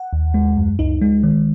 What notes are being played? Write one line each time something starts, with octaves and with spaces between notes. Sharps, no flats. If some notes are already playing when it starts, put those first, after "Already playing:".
Already playing: F#5
D#2
G#3
F#2
C#2 D#4
G#3
D#3